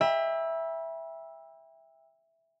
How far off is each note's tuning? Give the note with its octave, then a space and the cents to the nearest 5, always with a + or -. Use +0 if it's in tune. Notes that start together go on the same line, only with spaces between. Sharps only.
E5 +0 G5 +35 B5 -35